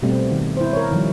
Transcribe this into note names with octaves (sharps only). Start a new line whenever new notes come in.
B2 G3 A3 B3 C4
D#3
E4 C5
A#4 C#5
D#3 F3 G3